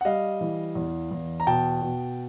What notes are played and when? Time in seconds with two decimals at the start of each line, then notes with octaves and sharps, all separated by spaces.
0.01 F#5
0.05 G3 D#5 F5
0.41 E3
0.75 E2
1.11 E2
1.40 A#5
1.47 B2 G5 A5
1.82 B2